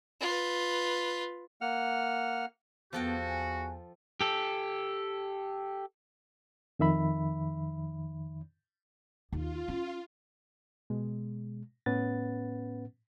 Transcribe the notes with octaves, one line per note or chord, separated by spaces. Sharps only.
F4 B4
A#3 F#5 F6
E2 F3 B3 F#4 A4 G5
G#5
G4 A4
F2 D#3 E5 B5
D#2 F4
C#4
B2 G#3
A2 B3 C#4 B4 F#5 A6